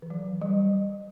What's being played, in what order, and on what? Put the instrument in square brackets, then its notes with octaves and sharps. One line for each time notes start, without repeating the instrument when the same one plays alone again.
[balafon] E3
F#3
G3